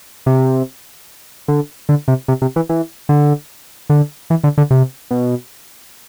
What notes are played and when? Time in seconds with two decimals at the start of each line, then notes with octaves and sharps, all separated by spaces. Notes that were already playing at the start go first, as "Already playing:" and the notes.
0.26 C3
1.48 D3
1.89 D3
2.08 C3
2.28 C3
2.42 C3
2.56 E3
2.69 E3
3.09 D3
3.89 D3
4.30 E3
4.44 D3
4.58 D3
4.71 C3
5.11 B2